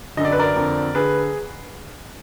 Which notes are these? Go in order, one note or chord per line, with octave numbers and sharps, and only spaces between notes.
F#2 D3 D5 D#5
B4
A#4 D5
F2 D3
D3 G#4 B4